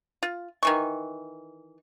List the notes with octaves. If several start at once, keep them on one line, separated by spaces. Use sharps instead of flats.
F4
D#3 E3 C#6